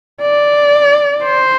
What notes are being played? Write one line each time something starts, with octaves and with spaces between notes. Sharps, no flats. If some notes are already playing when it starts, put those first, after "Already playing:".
D5
C5